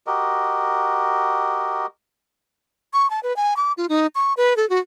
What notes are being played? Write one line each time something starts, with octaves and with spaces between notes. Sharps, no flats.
F#4 G4 A#4 D#5
C#6
A5
B4
G#5
D6
F4
D#4
C#6
B4
A4
F#4